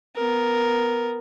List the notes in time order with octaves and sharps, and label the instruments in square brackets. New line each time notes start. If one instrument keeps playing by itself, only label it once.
[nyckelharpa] B3 A#4